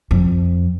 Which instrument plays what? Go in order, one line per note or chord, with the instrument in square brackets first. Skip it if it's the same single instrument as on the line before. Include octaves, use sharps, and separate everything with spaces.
[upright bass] F2